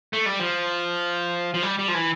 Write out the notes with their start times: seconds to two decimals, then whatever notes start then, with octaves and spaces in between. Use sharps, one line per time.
0.13 A3
0.26 G3
0.40 F3
1.54 F3
1.62 G3
1.79 G3
1.88 F3
1.94 E3